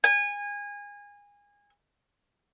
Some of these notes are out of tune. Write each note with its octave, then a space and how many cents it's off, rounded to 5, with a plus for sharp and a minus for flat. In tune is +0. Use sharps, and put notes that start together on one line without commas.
G#5 -25